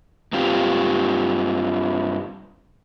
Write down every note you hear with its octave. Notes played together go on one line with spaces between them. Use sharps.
G2 C4 F4 G4